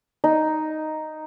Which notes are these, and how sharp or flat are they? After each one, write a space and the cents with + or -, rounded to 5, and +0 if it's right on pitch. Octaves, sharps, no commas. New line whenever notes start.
D#4 +0